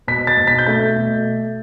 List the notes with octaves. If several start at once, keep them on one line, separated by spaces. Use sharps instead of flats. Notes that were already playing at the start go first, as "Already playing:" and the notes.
B2 B6
A6
B2
B6
G6
A3 A6
B2